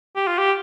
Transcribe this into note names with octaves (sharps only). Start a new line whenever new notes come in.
G4
F4
G4